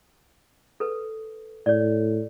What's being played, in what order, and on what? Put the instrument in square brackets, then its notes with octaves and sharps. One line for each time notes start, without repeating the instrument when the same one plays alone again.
[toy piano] A4 B4
[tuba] A2 [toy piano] C#5 D5